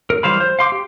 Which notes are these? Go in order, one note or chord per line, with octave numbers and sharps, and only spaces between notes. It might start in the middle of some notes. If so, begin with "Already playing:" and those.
A#4
E3 G3 C5 F5 B5
C5
F5 C6 D6
G4